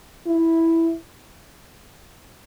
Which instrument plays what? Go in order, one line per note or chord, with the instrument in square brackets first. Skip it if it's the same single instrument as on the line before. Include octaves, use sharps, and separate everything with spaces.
[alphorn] E4